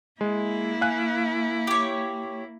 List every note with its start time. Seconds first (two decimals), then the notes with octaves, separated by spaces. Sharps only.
0.21 G#3 A#3 E4
0.81 F5 G#5 F#6
1.67 G4 C#5